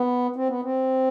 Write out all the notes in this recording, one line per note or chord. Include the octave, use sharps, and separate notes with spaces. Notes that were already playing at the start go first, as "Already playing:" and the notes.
Already playing: B3
C4
B3
C4